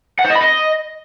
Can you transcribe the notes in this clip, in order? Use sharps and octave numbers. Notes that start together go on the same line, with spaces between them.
F#5
C5
D#5
B5
D#5